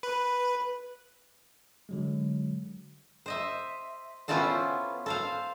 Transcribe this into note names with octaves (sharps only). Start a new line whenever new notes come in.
B4
D3 F#3 G#3
C5 D#5 E5
B3 C#4 E4 F4 A4 C5
A4 C5 F5